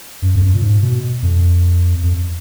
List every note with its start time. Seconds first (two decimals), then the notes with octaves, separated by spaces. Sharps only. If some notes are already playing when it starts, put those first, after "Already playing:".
0.22 F#2
0.35 F2
0.42 F#2
0.54 A#2
0.62 G#2
0.82 B2
1.22 F2
2.03 F2